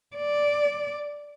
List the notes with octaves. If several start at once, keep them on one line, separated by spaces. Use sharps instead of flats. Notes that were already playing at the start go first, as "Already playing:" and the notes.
D5